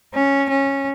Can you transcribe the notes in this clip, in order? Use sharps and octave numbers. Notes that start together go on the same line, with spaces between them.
C#4
C#4